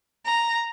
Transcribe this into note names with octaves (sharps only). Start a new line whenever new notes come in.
A#5